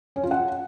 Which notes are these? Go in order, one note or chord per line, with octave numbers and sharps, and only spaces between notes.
C#4
F4
F#5